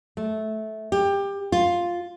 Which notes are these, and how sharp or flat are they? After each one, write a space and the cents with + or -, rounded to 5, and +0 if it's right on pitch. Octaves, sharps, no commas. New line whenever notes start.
A3 -15
G4 +20
F4 +5